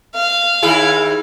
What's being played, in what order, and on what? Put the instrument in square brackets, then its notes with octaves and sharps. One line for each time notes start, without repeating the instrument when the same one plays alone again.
[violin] F5
[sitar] D#2 E4 G#4